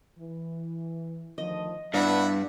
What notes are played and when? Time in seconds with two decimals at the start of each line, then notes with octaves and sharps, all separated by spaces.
0.18 E3
1.38 D2 D#3 F3 D#5
1.94 G2 B3 D4 E4 E5 F#5 B5